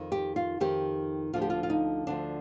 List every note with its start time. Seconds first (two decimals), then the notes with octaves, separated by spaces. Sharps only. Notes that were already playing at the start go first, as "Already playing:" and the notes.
Already playing: F2 D#3
0.12 G4
0.36 F4
0.60 F2 D#3 G4
1.33 D2 D3 F3 F4
1.42 G4
1.50 F4
1.63 F4
1.70 D#4
2.07 D2 D3 F3 D4